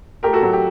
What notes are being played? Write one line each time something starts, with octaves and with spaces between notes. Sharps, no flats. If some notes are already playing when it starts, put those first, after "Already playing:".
A3 G4 A#4
F#4 A4
F#3
G4